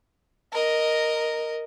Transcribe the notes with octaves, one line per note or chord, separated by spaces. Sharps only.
A#4 D#5